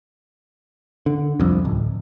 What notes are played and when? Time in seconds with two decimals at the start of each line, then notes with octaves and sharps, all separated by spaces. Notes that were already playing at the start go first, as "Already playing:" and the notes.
1.06 D3
1.40 C2 F2
1.65 D1